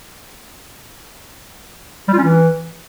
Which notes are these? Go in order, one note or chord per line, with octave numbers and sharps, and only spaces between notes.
G3
F4
C#4
E3